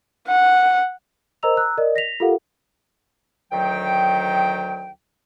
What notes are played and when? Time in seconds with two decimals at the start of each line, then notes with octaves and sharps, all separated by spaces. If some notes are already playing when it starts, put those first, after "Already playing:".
0.27 F#5
1.43 A#4 C5 D#5 A#5 E6 F7
1.57 A#5 E6 F#6
1.78 A#4 D5 D#5
1.96 A#6 B6 F7
2.20 F4 G4 A4 A#4 F5 F#5
3.52 D2 D#3 F#3 G5